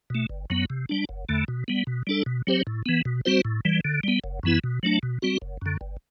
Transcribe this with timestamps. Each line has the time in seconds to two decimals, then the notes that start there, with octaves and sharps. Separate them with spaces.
0.10 B2 A3
0.30 G1
0.50 F#2 F#3 B3
0.70 C3
0.89 G3 D4
1.09 F#1
1.29 E2 D3 A3
1.48 B2
1.68 G3 B3
1.87 B2
2.07 G3 D4 A4
2.26 B2
2.47 F#3 C4 G4 C5
2.67 A2
2.86 E3 B3
3.05 B2
3.25 G3 C4 F#4 C5
3.45 A2
3.65 E3 G3
3.85 D3
4.03 G3 B3
4.24 F#1
4.43 F#2 E3 B3 E4
4.64 B2
4.83 F#3 A3 D4
5.03 B2
5.22 G3 C4 F#4
5.42 F#1
5.62 F#2 D3
5.81 G1